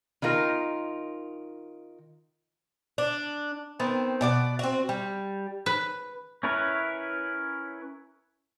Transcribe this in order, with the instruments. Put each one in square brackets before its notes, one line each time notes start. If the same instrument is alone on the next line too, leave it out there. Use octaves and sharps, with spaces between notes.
[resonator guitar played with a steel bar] D#3 D#4 F4 A#4
[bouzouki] D4
D#3 B3 C4
B2 D5 F#5
C4 F#4
G3
[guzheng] B4
[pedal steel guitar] C#4 E4 A#4 B4 C#5